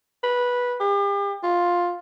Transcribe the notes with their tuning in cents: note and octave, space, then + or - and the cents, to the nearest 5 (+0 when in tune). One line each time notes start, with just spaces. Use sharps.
B4 -10
G4 +40
F4 +10